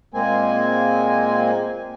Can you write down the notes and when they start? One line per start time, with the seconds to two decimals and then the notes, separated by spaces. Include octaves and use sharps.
0.14 A#2 G#3 A#3 C4 G#5